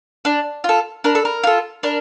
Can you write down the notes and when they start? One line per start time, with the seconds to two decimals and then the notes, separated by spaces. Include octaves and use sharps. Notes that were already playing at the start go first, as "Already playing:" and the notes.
0.25 D4
0.64 F4 A4
1.04 D4 A#4
1.15 A4
1.25 A#4
1.43 F4 A4
1.83 D4 A#4